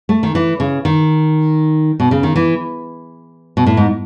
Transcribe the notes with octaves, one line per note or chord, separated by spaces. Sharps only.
A3
D#3
E3
C#3
D#3
B2
C#3
D#3
E3
B2
A2
G#2